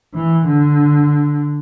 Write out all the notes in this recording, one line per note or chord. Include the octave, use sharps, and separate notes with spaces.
E3
D3